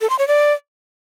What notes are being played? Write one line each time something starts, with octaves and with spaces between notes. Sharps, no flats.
A4
C6
C#5
D5